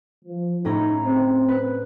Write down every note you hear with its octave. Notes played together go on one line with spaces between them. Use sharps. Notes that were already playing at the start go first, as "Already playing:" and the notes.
F3
A2 C#4 D#4 A#5
C4
B4